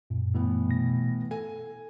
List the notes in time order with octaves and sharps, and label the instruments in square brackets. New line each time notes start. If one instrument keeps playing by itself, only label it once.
[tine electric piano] F#2 A#2
[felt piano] A2 E3 B3
[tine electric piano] B2 A#6
[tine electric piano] A4 [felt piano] G#5